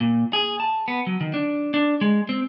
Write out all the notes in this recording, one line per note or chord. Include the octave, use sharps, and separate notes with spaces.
A#2
G#4
A5
B3
F#3
D#3
D4
D4
G#3
C4